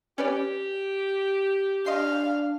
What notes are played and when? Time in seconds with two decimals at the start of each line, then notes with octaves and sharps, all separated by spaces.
0.18 C#4 G4 B4 D5
1.86 D4 D#5 F5 C6 C7